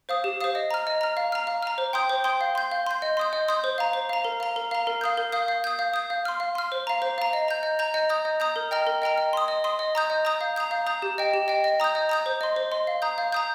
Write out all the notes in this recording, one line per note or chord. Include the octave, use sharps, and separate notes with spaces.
C5 F5 D#6
G4
C5 F5 D#6
D#5
A#5 F6
D#5
A#5 F6
F5
A#5 F6
F5
A#5 F6
C5
G5 C6 D#6 G6
C5
G5 C6 D#6 G6
F5
C6 G6
F5
C6 G6
D#5
C6 D#6 G6
D#5
C6 D#6 G6
C5
F5 A#5
C5
F5 A#5
A#4
F5 A#5
A#4
F5 A#5
A#4
F5 D#6 G6
A#4
F5 D#6 G6
F5
D#6 G6
F5
D#6 G6
F5
C6 F6
F5
C6 F6
C5
F5 A#5
C5
F5 A#5
D#5
A#5 G6
D#5
A#5 G6
D#5
A#5 D#6 G6
D#5
A#5 D#6 G6
A#4
D#5 G5 A#5 F6
A#4
D#5 G5 A#5 F6
D#5
C6 D#6
D#5
C6 D#6
D#5
A#5 D#6 G6
D#5
A#5 D#6 G6
F5
A#5 D#6 G6
F5
A#5 D#6 G6
G4
D#5 G5
G4
D#5 G5
D#5
A#5 D#6 G6
D#5
A#5 D#6 G6
C5
D#5 C6
C5
D#5 C6
F5
A#5 D#6 G6
F5
A#5 D#6 G6